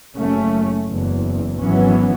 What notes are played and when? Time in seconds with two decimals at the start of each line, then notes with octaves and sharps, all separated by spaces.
0.16 F#1 A3 C#4
0.89 F#1 E2
1.61 G#1 E3 F#3 B3 C#4